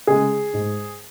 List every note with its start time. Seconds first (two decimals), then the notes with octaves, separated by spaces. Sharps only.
0.07 C#3 G#3 G#4
0.53 G#2 G#3